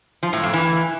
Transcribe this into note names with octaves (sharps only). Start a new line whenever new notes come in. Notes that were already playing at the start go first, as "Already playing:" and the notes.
F3
A2
F2
E3